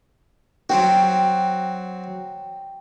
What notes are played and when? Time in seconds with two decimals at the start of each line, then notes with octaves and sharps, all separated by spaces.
0.69 F#3 C4 F#4 G5